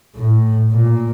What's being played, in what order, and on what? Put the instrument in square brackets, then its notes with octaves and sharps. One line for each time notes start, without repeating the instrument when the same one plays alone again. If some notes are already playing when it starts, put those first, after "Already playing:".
[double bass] A2
A#2